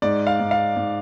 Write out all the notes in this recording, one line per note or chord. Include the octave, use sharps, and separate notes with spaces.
G#2 D5
F5
G#2
F5
G#2